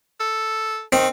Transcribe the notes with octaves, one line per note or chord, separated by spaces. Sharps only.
A4
D#3 C4